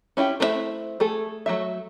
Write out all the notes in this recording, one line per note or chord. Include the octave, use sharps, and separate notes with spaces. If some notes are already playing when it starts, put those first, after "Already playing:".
C#4 E4 F4 G4
A3 C4 D4 E4 E5
A3 G#4 A4
F#3 A3 E5